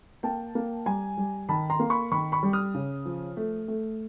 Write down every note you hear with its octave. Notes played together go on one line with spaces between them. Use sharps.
A#3 G5 A5
A#3
G3 G#5 A#5
G3
D#3 A5 B5
A#5 C6
A#3
B5 C#6
D#3 B5 C#6
B5 C#6
G3
D#6 F6
C#3
F3
A3
A3